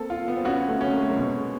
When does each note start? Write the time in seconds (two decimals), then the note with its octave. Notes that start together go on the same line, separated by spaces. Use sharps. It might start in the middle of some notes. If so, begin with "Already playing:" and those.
Already playing: A#3 C4 A4
0.10 F4
0.28 B3
0.36 C4
0.45 B3 C#4 F#4
0.69 A3 B3
0.81 C#4
0.93 A#3
1.01 A3
1.09 G#3 A#3
1.16 B2